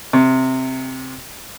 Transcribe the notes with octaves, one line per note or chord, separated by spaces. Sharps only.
C3